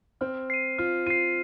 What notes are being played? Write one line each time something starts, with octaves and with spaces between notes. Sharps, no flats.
C4 F6
C7 D#7
F4 F6
F4 C7 D#7